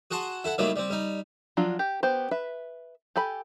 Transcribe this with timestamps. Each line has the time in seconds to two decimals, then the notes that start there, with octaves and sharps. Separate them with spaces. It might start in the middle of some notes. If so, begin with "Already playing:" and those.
0.11 F#4 G#4 F#5 A5 C6
0.44 E4 A4 F#5
0.58 D#3 F#3 G3 A3 A#3 E4
0.76 G3 C4
0.90 G3 D#4
1.57 F3 F#3 D4 F4
1.79 G4
2.03 B3 G4 C5
2.31 B4 E5
3.16 G4 A4 G#5 B5